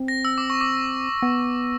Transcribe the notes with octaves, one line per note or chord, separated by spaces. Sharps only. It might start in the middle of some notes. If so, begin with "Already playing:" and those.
Already playing: C4
A#6
E6
D6
C#6
D6
B3